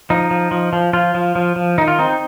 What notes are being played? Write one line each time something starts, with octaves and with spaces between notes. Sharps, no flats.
F3 D#4
F3
F3
F3
F3 F4
F3
F3
F3
D#3 D#4
F4
C4 D#4